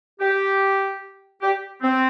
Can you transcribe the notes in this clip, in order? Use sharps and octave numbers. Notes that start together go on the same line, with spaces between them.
G4
G4
C4